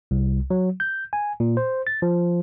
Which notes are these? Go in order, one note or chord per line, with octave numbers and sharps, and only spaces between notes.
C2
F#3
G6
G#5
A#2
C5
A6
F3